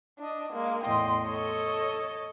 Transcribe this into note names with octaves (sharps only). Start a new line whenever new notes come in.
D4 D#5
G#3 A#3
E2 A2 D#5 G5 C6
A4 C#5 D#5